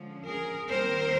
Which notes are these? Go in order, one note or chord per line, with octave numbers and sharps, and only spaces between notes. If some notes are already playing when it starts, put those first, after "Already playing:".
Already playing: D3 F3 G#3 C#4
G#4 A#4
D#2 D#3 G3 C4 A#4 C5